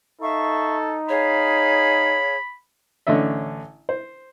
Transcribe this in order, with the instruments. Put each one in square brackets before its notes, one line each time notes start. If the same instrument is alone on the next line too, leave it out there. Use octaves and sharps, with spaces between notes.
[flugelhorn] D#4 [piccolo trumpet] A4 [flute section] E5 F5 C#6
[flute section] G#4 F5 [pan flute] C#5 [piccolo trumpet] B5
[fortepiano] A1 D3 A3 C#4 D#5 E5
C5